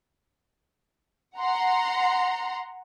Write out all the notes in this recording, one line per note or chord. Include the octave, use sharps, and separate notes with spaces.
F#5 A#5 C6